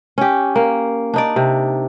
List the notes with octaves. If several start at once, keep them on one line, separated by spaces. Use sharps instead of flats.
C#4 G4
A#3
D4 D#4 D5
C3